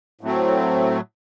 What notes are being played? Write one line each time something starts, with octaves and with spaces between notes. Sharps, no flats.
A2 F#3 A3 C4